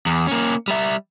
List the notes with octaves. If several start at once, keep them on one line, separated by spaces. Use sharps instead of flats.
E2
A#3 C#4
G3 E5